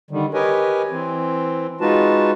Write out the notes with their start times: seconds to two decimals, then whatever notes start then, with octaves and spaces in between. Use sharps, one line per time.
0.11 D3 D#3 G3
0.34 G4 A#4 B4 C#5 D#5 G#5
0.91 E3 C4
1.81 G#3 D#4 F4 F#4 B4 A5